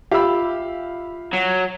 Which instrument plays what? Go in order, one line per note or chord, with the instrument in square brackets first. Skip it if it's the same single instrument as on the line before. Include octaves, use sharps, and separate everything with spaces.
[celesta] F4 E5 [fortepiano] G4 E6 [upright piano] F5 B5
[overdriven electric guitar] F#3